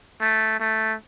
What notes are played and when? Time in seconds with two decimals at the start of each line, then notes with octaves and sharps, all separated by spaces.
0.21 A3
0.60 A3